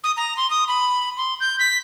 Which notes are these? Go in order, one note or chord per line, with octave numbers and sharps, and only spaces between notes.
D#6
A#5
C6
D#6
B5
C6
G6
B6